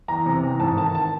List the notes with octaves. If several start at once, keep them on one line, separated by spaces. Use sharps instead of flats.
E2 A#5
C3
E2
G#2 A5
D#3 A5
A5